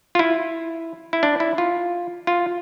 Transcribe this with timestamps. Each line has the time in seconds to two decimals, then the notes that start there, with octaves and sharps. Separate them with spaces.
0.15 F4
0.19 E4
1.13 E4
1.23 D4
1.40 E4
1.58 F4
2.27 F4